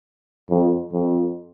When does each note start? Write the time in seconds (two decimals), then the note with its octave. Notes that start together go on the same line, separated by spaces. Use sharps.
0.50 F2
0.93 F2